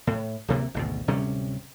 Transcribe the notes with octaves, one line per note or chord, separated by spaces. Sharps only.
A2
D1 C3 A#3
G#1 D2 B2
D1 C3 G3 C#4